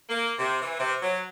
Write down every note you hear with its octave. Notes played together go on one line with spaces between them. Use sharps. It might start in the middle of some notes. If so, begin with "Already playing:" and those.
A#3
C3
E3
C3
F#3